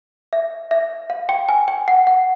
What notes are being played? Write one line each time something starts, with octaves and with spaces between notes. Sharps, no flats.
E5
E5
F5
G5
G#5
G5
F#5
F#5